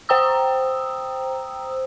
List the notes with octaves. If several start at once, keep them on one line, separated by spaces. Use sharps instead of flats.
C5 G5 A#5 D#6 E6